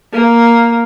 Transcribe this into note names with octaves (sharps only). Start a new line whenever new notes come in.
A#3